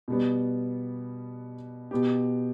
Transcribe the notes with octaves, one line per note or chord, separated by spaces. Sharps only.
B2 G3 B3
B2 B3 G4